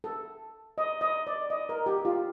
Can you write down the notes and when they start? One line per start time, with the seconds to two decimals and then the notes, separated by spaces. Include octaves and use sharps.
0.04 A4
0.78 D#5
1.01 D#5
1.27 D5
1.50 D#5
1.69 A#4
1.86 G4
2.05 F4